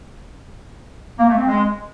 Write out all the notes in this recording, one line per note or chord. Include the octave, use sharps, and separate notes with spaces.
A#3
A3
C4
G#3